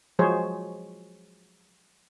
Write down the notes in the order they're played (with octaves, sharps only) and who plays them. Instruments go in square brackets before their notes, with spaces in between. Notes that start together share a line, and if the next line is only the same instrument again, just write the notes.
[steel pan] F3 F#3 G#3 G#4 C5 C#5